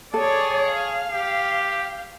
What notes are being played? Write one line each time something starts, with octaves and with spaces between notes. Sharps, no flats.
G#4 A4 C#5 D5
F5
G4